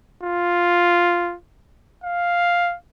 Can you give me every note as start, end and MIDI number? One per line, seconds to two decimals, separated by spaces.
0.23 1.35 65
2.04 2.75 77